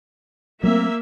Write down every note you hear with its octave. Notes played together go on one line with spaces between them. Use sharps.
F#3 A3 A#3 C4 E5